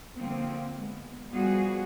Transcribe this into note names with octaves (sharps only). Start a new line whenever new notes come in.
D3 F3 A#3 C4
G#3 B3
F3 G3 B3 F#4 G#4